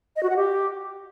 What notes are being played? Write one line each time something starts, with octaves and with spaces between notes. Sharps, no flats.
D#5
F#4
F#5
G4